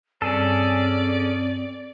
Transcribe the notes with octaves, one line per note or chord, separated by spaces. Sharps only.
G2 C4 C#4 G#4 A4 D5